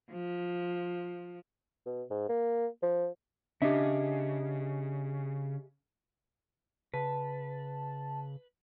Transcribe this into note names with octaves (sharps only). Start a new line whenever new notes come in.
F3
B2
G#2
A#3
F3
C#3 D4 G4 D#5 E5
C#3 B4 A5